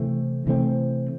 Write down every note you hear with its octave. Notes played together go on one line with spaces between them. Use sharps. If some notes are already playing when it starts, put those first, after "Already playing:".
Already playing: C3 E3 A3 C4
C3 E3 A3 C4